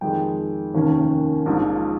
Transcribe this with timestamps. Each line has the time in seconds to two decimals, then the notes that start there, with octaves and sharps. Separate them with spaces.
0.01 F2 D#3 G#3 G5
0.74 F1 D#2 D#3 A#3 C#4
1.46 A#1 G#2 F3